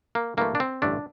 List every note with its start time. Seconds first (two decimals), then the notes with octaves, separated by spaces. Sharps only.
0.15 A#3
0.37 G2 E3 A3 A#3
0.55 D4
0.60 C4
0.82 A1 G2 D3 A3 D4